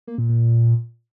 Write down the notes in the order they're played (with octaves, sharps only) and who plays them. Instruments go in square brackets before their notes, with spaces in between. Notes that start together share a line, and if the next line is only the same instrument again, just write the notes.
[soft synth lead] A#3
A#2
A#2